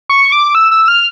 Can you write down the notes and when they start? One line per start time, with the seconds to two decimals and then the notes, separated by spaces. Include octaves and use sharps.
0.09 C#6
0.32 D6
0.55 E6
0.71 E6
0.88 F6